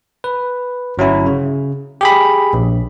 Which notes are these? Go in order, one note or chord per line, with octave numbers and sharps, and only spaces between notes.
B4
G1 F#3 C#4 E4
C#3
G4 G#4 B5
A#1